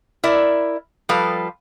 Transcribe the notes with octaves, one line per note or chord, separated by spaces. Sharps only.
E4 A#4 D5 E5
F3 G3 A4 B4 F5